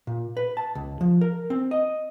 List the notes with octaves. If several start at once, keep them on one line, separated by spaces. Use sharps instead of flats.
A#2
B4
A5
C#2
F3
A#4
C4
D#5